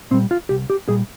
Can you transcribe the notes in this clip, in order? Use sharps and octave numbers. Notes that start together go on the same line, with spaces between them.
A#2 G3 C4
F4
C2 G4
G4
A#2 G3 G#4